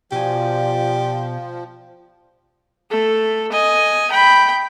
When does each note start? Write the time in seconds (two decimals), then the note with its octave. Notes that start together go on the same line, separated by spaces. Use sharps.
0.12 B2 F3 G4 D5 G#5
2.90 A3 A4
3.52 D#5 G#5
4.11 G5 B5